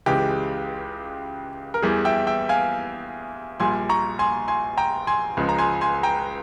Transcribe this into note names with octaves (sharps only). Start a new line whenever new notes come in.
C#2 C#3 E3 G#3 G4
A#4
E2 E3 G3 G#4
E5 G5
E5 G5
F5 G#5
A#1 A#2 G3 G#5 C6
A#5 C#6
G#5 C6
G#5 C6
G5 A#5
G#5 C6
C#2 C#3 F3 G#3
A#5
G#5 C6
G#5 C6
G5 A#5